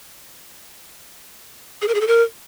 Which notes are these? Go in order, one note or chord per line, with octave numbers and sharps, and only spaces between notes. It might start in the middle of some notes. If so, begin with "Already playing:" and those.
G#4
A#4
G#4
A4
A#4